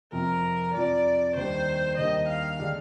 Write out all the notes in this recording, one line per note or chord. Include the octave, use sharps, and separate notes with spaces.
F2 C3 F3 A#4
F2 C3 F3 D5
D#2 D#3 G3 D4 G4 C5
D#2 D#3 G3 D4 G4 D#5
F5
D3 G#3 D4 G4